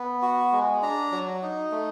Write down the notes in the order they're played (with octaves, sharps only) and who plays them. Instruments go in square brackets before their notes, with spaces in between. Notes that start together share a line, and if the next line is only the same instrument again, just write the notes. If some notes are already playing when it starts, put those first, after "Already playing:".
Already playing: [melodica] B3
F#4
G#3
D4 A#5
F#3
D#4
A3